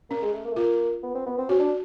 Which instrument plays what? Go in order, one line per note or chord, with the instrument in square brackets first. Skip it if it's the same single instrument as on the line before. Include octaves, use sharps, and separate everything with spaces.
[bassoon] A#3 [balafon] C#4
[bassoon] G#3
A3
A#3
A3
[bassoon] A#3 [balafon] F4
[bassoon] B3
C4
B3
C4
[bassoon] C#4 [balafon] F#4
[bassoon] D4